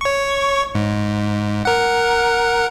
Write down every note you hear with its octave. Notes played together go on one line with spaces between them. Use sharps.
C#5 C#6
G#2
A#4 F#5